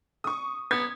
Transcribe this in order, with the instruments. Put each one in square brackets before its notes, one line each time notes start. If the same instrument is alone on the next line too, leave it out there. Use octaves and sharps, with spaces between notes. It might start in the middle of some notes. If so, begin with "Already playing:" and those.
[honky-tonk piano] C#6 D#6
[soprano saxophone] B3 [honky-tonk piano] G#6